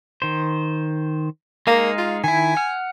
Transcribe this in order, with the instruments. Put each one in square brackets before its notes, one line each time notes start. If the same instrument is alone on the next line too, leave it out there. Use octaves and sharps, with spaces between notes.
[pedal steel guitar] D#3 C5
[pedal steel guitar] G#3 D#4 F5 [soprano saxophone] A#3
[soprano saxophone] F4
[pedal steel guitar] D#3 E4 [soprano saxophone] G#5
[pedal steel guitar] F#5 F6